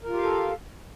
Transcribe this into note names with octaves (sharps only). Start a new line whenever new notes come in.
F4 G4 A4 A#4 F5